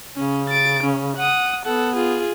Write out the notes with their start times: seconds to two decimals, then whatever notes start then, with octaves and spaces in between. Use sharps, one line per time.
0.17 C#3 C#4
0.49 A6 D7
0.83 C#4
1.17 F#5 D#6
1.66 B3 A4 F#5
1.96 F4 G#4